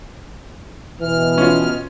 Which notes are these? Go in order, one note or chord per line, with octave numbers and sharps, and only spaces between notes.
B2 E3 F6
C#4 F4